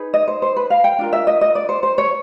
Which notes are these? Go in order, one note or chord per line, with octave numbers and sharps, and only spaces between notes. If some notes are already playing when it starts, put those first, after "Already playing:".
Already playing: D#4 G#4 B4
D#5
C5
C5
B4
F5
G5
D4 F4 A#4
E5
D#5
D#5
D5
C5
C5
C#5